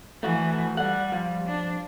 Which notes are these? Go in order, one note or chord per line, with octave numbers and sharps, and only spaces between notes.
E3 A3 F#4
G3 D5 F#5
F3
D4